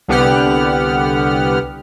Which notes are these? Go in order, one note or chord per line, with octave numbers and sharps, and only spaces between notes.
C2 D3 B3 G4 F#5 F6